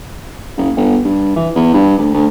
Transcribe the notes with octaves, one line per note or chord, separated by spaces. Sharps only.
F#1
G1
G2
E3
E2
G2
D2
D2